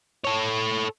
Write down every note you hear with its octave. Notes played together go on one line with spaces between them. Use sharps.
A4 C#5